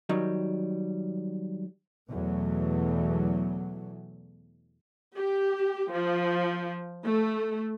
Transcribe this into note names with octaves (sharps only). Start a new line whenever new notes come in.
D#3 F#3 G3
E2 B2 F#3 A3
G4
F3
A3